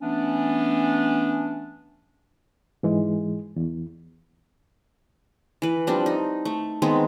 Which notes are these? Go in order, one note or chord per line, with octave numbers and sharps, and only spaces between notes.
E3 A3 B3 C#4 D4
G#2 E3 G#3
E2
E3 B4
F3 G3 C4 D4
D#4
A3
D#3 G#3 B3 C4